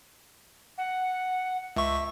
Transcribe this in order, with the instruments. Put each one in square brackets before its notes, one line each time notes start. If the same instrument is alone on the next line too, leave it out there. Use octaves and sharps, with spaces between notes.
[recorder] F#5
[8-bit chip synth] C#2 C#6 [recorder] E5